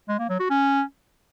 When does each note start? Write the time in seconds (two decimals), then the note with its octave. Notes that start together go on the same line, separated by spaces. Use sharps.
0.09 G#3
0.19 A#3
0.29 F#3
0.40 F#4
0.50 C#4